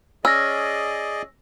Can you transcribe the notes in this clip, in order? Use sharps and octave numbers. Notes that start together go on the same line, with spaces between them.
C#4 G#4 D5 D#5 E6 A#6